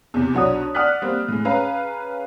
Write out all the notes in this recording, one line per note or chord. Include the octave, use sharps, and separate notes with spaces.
E2 C3
B1 D4 F#4 C#5 D#6
D5 F#5 D#6 F6 F#6 B6
G3 A#3 C4
A2 G#3
C#4 G#4 B4 F5 A#5